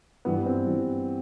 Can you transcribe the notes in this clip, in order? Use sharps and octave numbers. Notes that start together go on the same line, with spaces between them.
G2 E3 B3
C4
G2 E3